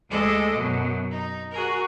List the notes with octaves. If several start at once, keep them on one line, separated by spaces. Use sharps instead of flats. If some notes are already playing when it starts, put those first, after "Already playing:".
D2 G#3 A4 D5 D#5
F#2 B2 F#3
D#4
F#4 G#4 A#4